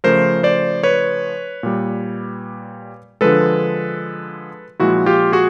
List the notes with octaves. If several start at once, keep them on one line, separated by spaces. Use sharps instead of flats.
C#3 F3 A3 A#4 C5
C5 D5
B4 C#5
A#2 G3
D3 F3 G#3 A4 B4
A#2 F3 G#3 E4 F#4
F4 G4
F#4 G#4